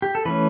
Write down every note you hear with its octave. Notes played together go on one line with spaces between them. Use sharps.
G4
A4
E3 A3 C#4 B4